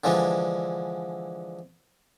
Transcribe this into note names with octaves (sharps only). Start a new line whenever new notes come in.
D3 E3 F3 G#3 D4